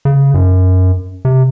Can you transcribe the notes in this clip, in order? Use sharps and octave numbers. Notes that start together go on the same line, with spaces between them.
C#3
F#2
C3